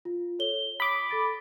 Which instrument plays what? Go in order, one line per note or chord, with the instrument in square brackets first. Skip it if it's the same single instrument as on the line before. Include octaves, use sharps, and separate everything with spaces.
[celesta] F4
A4 C#5 G7
[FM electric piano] B5 D6 [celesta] D#6 B6
[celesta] A4 A6 D7